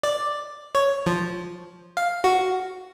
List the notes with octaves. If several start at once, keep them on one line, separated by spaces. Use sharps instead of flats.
D5
C#5
F3
F5
F#4